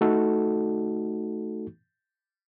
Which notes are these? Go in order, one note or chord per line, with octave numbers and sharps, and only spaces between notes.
A3 D#4 F#4 A4